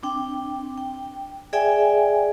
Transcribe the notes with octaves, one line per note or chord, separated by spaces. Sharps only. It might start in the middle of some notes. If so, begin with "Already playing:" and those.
C4 D4 G5
G5
G#4 D5 E5 G5 G#5